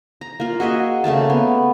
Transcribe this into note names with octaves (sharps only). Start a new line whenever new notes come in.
A#5
A#3 F4
F#4 G#4 D#5 E5
C#3 A3 A#3 A5
B3